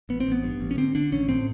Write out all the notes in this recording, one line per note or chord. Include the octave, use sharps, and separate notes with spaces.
A1 B3
C4
A1 B3
G2
A1
C#4
D3 C4
D3 D4
A1 C#4
A2 C4